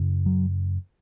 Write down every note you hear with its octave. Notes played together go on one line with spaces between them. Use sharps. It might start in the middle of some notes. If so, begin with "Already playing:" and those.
Already playing: F#2 C#3
F#3